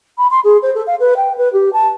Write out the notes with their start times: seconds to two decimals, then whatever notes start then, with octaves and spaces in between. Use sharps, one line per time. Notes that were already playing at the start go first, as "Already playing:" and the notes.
0.18 B5
0.30 C6
0.44 G#4
0.62 C5
0.75 A4
0.87 F5
1.00 B4
1.17 G5
1.37 B4
1.53 G4
1.73 A5